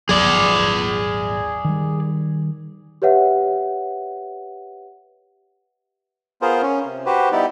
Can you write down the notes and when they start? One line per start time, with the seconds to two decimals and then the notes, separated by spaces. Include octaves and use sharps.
0.09 D#1 G#1 F#3 G#4 D5
1.64 D#3 G3
3.02 G4 B4 C#5 E5 F#5
6.42 B3 F4 G#4 A#4 C5
6.62 C#4
6.85 C3
7.06 F#4 G4 B4 C5
7.32 G3 B3 D#4 E4 G4 D5